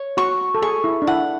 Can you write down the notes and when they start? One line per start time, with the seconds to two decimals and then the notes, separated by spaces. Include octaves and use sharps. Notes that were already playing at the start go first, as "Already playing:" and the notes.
Already playing: C#5
0.17 F#4 C#6
0.55 A4
0.62 G#4 C#6
0.84 E4
1.02 D4
1.07 E4 F#5